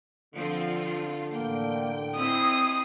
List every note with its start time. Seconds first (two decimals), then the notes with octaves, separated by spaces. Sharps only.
0.34 D3 F3 C4 F4
1.31 A1 A#3 G5
2.16 C4 E4 D#5 D#6 C7